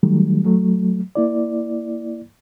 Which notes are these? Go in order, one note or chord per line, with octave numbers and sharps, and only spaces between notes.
D#3 F#3 G3 A3
F#3 A3
A#3 E4 D5